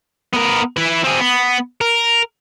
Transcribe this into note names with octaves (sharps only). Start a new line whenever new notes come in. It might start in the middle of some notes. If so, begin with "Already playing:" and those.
B3 A#4
E4 B4
C4 G#4
B3
A#4